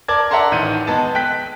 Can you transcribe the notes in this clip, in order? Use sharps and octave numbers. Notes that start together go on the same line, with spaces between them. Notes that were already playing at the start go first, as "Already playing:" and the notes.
A#4 D5 A5 D6 G#6
D5 E5 F#5 A5 A#5 C6
A1 D#3 G6 D#7
G#3 B3 A5
G5 F#6 B6